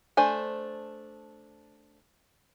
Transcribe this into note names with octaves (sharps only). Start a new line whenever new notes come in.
A3 D4 C5 G#5